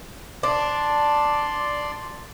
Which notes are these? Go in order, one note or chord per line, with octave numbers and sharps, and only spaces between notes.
D4 D5 C6